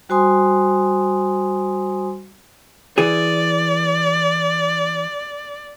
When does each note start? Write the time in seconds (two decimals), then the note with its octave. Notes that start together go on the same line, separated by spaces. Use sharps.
0.09 G3 F#4 C5 G#5 C6 D#6
2.98 E3 G#4 D5